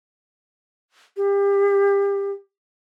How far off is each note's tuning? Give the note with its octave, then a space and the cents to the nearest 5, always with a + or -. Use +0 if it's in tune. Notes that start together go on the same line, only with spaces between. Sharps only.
G4 +30